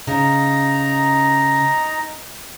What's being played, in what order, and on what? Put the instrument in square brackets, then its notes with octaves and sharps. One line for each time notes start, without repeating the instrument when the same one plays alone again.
[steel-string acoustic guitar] C#3 [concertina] D#4 A#5